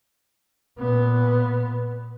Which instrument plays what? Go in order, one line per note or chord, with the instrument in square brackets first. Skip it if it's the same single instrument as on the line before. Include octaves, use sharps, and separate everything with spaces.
[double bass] A#2 B3